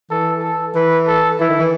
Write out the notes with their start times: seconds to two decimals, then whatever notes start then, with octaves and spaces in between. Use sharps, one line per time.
0.11 E3 A4
0.43 A4
0.75 E3 B4
1.08 A4
1.40 E3 E4
1.49 D#3
1.59 E3